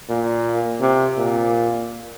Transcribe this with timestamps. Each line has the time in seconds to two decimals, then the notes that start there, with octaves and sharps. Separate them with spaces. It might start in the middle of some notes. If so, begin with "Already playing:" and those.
0.09 A#2
0.81 C3
1.17 A#2